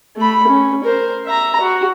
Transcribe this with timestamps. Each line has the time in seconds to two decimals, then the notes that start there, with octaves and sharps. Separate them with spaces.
0.17 A3 B5
0.48 C#4
0.84 A#4 C5
1.25 E5 A#5
1.60 F#4